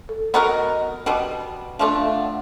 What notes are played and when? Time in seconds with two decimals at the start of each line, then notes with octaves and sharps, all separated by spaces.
0.09 A4
0.34 B3 D#4 F#4 A#4 D#5
1.06 B2 G3 B3
1.79 F3 A3 D4 E5
1.98 F5
2.16 F#5